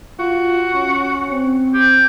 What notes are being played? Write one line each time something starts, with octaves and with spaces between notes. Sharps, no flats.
F4 F#4
C#4
C4
G4